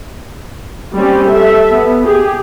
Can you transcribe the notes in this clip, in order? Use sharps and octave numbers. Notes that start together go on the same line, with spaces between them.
G3 C4 C#4
A4 E5
B3
G4 G#4